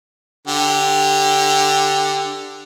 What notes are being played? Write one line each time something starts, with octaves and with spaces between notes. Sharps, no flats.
D3 G4